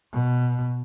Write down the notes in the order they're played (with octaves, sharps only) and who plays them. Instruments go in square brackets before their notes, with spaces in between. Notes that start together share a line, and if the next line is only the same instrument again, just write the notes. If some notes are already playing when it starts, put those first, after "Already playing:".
[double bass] B2